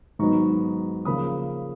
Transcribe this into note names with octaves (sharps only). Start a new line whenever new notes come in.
G#2 D#3 F#3 B3 A#5 C#6
C#3 F3 A#3 B5 D#6